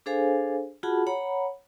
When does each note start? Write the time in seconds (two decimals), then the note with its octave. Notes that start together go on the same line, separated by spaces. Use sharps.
0.06 D4 G#4 A4 C5 F5 G#5
0.83 F4 F#4 G#4 F#5 A5 B5
1.07 C#5 F#5 A#5 B5